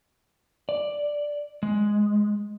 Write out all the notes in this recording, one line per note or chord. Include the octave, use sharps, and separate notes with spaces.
D5
G#3